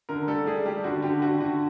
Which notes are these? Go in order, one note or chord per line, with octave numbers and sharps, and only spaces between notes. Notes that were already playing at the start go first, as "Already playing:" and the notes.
D3 A#4
G3 A4
G3 G#4
G3 G4
D3 F#4
D3 G4
D3 F#4
D3 F#4